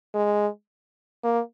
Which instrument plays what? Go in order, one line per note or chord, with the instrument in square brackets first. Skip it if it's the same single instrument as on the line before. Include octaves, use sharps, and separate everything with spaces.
[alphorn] G#3
A#3